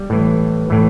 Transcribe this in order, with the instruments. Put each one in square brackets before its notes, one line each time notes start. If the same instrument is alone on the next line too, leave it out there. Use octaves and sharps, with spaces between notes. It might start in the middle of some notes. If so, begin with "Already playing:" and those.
Already playing: [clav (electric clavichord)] G3
A2 E3
A2 E3